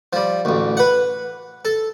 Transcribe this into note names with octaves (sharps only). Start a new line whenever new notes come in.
F3 G3
A1 D2
B4 F#5
A4